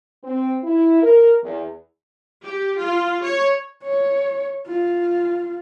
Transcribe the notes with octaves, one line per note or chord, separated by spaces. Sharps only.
C4
E4
A#4
E2
G4
F4
C#5
C#5
F4